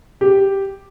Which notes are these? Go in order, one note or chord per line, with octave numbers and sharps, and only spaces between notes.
G4